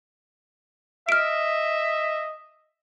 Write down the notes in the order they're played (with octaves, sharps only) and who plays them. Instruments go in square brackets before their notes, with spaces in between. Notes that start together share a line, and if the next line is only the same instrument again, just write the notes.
[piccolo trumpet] D#5 [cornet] E5 [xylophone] F6 D7